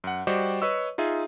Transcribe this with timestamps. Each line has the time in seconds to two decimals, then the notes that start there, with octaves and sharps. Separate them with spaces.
0.04 F#2 F#5
0.27 G3 F#4 G4 C5 D5 D#5
0.62 B4 C#5 D#5 C#6 E6
0.98 D#4 F4 G#4 E5